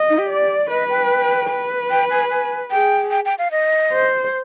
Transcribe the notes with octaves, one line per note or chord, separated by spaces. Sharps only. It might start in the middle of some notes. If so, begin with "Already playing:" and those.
Already playing: D#5
D#4
G4
D5
B4 D#5
G5
B4
G5
G#5
G#5
G#4 G5
G5
G5
F5
D#5
C5